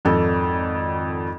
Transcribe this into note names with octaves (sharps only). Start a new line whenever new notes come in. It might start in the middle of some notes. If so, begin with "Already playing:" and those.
G#1 F2 A4